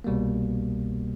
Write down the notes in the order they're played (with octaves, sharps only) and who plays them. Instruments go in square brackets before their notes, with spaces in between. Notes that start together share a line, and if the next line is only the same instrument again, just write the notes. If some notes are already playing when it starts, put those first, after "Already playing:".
[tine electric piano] C2 B2 G3 A#3